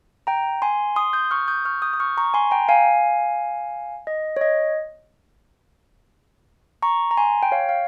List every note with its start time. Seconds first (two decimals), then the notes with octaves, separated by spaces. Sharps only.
0.27 G5 A#5
0.62 G#5 C6
0.96 C6 D#6
1.13 D#6 G6
1.31 C#6 F6
1.48 D#6 G6
1.65 C#6 F6
1.82 D#6 G6
1.94 D#6
2.00 C#6 F6
2.17 A#5 C#6
2.34 G#5 C6
2.51 G5 A#5
2.69 F5 G#5
4.07 D#5
4.37 C#5
4.41 D#5
6.82 A#5 C#6
7.11 A#5
7.17 G#5 C6
7.43 G5
7.52 C#5 F5
7.69 F5